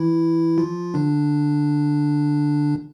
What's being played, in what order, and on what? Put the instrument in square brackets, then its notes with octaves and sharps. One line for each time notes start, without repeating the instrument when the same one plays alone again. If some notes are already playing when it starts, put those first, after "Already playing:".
Already playing: [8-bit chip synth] E3 E4
F3 F4
D3 D4